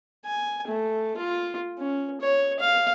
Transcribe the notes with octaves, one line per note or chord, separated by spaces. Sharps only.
G#5
A3
F4
C#4
C#5
F5